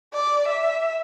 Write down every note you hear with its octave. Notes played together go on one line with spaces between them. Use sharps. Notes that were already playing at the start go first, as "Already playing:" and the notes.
D5
E5